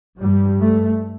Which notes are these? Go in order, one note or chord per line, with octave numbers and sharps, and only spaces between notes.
G2 G3
A3